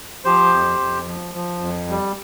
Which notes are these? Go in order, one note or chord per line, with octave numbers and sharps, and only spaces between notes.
F3 G4 C5
F2
F2
F3
F3
F2
G3